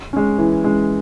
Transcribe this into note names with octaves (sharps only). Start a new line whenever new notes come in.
G#3 C#4
E3
G#3 C#4